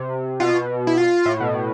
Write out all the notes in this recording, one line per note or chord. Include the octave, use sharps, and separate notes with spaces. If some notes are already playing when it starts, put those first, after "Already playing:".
Already playing: C3
B2 F4
E4
F4
A2
B2